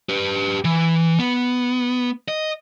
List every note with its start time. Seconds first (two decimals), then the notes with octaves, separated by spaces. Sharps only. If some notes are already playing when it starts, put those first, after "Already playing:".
0.09 G4 B4
0.65 E3
1.19 B3
2.28 D#5